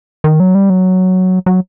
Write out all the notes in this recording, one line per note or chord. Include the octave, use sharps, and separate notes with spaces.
D#3
F#3
G3
F#3
F#3